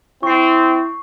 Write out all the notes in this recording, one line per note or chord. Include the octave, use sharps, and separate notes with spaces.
C4 E4 C#6 C7